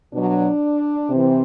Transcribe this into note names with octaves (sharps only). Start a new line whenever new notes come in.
B2 F#3 D4
C3 E3 C4